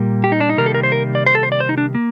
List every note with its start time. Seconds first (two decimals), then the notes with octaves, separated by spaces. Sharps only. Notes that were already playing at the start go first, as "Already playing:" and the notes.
Already playing: A#2 G3 A#3
0.24 G4
0.32 D#4
0.40 D4
0.49 D#4
0.58 C3 D#3 G3 A#3 A#4
0.66 A4
0.74 A#4
0.83 C5
0.92 A#4
1.15 D5
1.26 C5
1.35 A4
1.43 C5
1.52 D5
1.60 C5
1.69 D#4
1.78 D4
1.95 A#3